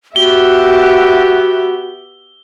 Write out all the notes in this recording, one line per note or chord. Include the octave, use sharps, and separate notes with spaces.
B3 F#4 G4 E5 G7